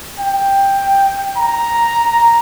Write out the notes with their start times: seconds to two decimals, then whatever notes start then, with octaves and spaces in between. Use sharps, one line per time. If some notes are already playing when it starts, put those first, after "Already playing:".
0.20 G5
1.38 A#5